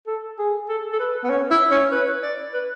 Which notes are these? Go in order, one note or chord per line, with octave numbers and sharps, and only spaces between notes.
A4
G#4
A4
A4
B4
B3
C#4
E4
C#4
B4
D5
B4